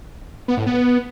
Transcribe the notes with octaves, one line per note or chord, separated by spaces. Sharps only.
B3
A2
B3